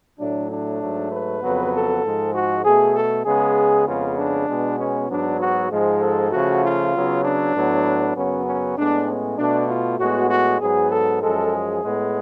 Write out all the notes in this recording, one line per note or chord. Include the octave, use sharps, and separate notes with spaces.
A2 F#3 A3 D4
D4
G#2 F#3 A3
B4
F2 C#3 F#3 B3
A4
G#2 F3 G#3
F#4
B2 A3 G#4
A4
C#3 G#3 B3 G#4
F2 C#3 G#3 B3 F4
D4
B2 G#3 B3
C#4
G#2 F#3 B3 D4
F#4
G#2 F3 G#3
A4
C#3 F3 A3 F#4
F4
C#3 F#3 B3
D4
A2 F#3 B3
F#2 C#3 F#3 B3 C#4
C#4
A2 G#3 B3 D4
C#4
B2 A3 D4
F4
A2 G#3 B3 F#4
F#4
G#2 F#3 B3 G#4
A4
F#2 F3 G#3 A4
G#4
A2 G#3 B3